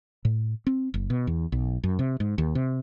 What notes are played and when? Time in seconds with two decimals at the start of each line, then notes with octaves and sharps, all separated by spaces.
0.25 A2
0.67 C4
0.94 F#1
1.10 B2
1.27 E2
1.52 B1
1.84 F#2
1.99 C3
2.20 G#2
2.38 D#2
2.55 C3